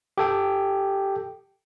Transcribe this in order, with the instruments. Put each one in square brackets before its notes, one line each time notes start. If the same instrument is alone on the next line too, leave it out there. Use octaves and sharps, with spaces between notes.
[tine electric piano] G4 A4 G5